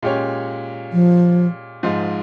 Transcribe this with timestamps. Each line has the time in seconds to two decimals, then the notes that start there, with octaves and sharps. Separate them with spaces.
0.02 A#2 G#3 C#4 G4 C#5
0.93 F3
1.83 G#2 F3 G#3